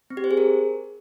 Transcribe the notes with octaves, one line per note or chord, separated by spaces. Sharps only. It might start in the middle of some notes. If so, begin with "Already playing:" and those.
C4
G4
C5
G#4
A#4